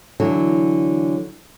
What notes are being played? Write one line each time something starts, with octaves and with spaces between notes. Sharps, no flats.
D3 E3 F#3